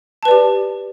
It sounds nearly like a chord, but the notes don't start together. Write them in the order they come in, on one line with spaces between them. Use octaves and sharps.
A5 B4 D5 G4